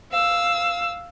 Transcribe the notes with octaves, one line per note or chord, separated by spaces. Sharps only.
F5 E6